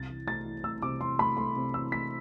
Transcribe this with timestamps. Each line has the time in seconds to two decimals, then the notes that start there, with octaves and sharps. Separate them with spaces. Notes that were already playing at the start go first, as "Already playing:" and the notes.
Already playing: C2 A6
0.10 E3
0.27 A3 A6
0.46 E3
0.64 A3 E6
0.82 C3 D6
1.01 E3 C6
1.19 A3 B5
1.37 A3 C6
1.56 C3
1.74 E3 E6
1.92 A3 B6